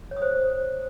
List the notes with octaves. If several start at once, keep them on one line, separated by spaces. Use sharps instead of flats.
C#5
D#6
C5